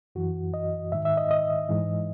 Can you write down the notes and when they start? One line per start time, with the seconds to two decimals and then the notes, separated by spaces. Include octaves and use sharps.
0.15 F#2 E3 F#4
0.54 D#5
0.92 G#2 D#3 E5
1.05 E5
1.17 D#5
1.31 D#5
1.69 G#2 E3